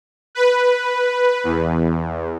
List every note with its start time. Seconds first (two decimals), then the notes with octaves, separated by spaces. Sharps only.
0.35 B4
1.44 E2